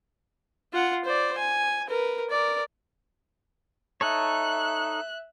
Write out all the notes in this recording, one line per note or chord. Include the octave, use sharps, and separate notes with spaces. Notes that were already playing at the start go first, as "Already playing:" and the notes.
F4 F#5
C5 D5
G#5
A#4 B4
A#4 D5
D#4 A4 C#5 E5 F#6